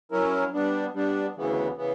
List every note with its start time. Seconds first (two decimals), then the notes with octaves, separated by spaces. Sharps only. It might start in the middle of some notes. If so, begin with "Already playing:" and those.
0.11 F#3 C#4 E4 A#4
0.53 G3 B3 D4
0.94 G3 B3 D4
1.35 D2 C#3 E3 B3
1.76 C#3 E3 B3